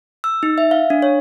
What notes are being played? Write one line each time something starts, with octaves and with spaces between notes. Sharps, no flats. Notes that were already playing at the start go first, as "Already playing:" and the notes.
E6
D#4
E5
F5
D4
C#5